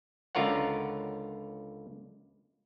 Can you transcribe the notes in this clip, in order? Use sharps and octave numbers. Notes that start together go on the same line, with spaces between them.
C#2 D3 F4 A#4 C#5 F#5